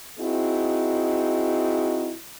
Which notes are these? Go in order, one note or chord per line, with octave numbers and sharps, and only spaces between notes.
C4 D#4 E4 F#4 G#4